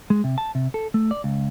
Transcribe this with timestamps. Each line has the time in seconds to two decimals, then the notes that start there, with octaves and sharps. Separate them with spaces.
0.10 G#3
0.24 C3
0.38 A5
0.55 C3
0.74 A4
0.94 A3
1.11 D5
1.24 C#2